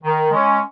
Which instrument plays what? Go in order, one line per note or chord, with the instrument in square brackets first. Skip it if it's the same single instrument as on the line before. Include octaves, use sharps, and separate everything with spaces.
[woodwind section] D#3
G#3 C#4